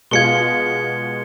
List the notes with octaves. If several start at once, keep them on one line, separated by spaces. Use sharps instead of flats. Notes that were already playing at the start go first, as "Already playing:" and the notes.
B2 G#3 F4 G#6 C#7 G7